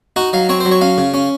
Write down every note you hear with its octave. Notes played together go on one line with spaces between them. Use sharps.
D#4 F#4
F#3 F5
C4 C#5
C5
F#3
C#5
C#4 F5
C#3
C#4